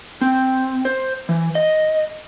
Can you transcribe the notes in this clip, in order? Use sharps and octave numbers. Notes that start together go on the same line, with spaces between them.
C4
C5
E3
D#5